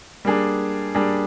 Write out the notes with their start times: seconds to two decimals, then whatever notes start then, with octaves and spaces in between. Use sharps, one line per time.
0.25 G3 A#3 D4 G#4
0.95 G3 A#3 D4 G#4